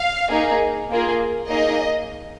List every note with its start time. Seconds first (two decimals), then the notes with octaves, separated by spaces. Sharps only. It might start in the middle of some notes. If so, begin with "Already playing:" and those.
Already playing: F5
0.30 A#3 D#4 G#4
0.90 A#3 F4 G#4
1.49 A#3 D#4 G#4 D#5